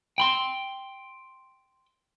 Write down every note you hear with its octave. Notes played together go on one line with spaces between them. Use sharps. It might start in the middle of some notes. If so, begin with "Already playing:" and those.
G5 B5 C6